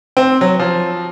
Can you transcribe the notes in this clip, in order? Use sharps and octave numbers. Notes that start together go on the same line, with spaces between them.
C4
F#3
F3